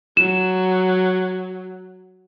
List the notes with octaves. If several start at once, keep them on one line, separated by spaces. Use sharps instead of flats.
F#3 E7